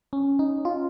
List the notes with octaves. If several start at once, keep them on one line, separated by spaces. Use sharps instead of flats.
C#4
D#4
F4